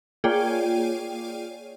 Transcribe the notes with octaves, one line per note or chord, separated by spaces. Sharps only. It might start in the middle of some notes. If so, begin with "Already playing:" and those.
A#3 F4 G#4 C#5 D5 G5